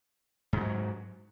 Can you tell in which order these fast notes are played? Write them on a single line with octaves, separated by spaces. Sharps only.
G#2 F3 F#3